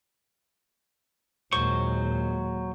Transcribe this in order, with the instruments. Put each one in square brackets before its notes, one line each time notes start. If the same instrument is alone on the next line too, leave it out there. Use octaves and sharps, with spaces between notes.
[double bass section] D#2 A#2 G#3 [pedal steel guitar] F#3 C5 C#6